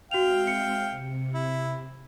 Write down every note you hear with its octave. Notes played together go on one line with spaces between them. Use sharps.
G#3 C4 F#4 E5 F5 G5 F7
C#7
C3
E4